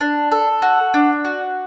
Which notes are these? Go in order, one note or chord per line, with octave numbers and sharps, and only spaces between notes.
D4
A4
F#4
D4
F#4